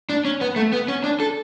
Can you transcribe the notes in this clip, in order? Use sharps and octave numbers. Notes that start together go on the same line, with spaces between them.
D4
C#4
B3
A3
B3
C#4
D4
A4